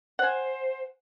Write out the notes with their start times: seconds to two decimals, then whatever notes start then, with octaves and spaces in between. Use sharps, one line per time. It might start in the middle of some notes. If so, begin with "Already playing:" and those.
0.19 C5 F#5 G#5